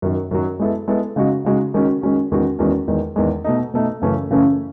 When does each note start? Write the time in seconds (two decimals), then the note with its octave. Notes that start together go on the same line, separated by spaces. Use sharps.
0.02 F#2 D#3 F#3
0.31 F#2 D#3 F#3
0.60 G#3 B3 E4 A4
0.88 G#3 B3 E4 A4
1.16 C#3 G#3 D#4 F#4
1.45 C#3 G#3 D#4 F#4
1.74 D#3 G#3 C#4 F#4
2.02 D#3 G#3 C#4 F#4
2.31 E2 D#3 G#3 C#4 F#4
2.59 E2 D#3 G#3 C#4 F#4
2.88 E2 D#3 G#3
3.16 E2 D#3 G#3
3.44 B2 A3 D#4
3.74 B2 A3 D#4
4.02 F#2 C#3 E3 A3 C#4
4.30 F#2 C#3 E3 A3 C#4